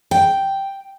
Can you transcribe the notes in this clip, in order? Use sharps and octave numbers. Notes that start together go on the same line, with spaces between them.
G5